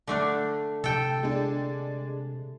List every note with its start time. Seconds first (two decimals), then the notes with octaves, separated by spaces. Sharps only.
0.07 D3 A3 D4
0.84 C3 A4 G5
1.23 G#3 D4